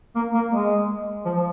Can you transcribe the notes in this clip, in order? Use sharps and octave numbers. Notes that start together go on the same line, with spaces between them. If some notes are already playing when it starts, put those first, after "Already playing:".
A#3
A#3
G#3
F3
F3